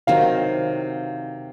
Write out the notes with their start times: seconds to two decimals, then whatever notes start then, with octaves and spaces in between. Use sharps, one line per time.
0.07 C3 D#3 F#3 F5